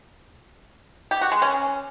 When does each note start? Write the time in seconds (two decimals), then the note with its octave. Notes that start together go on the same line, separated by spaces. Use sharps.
1.11 G4
1.21 F#4
1.32 G#3
1.42 C#4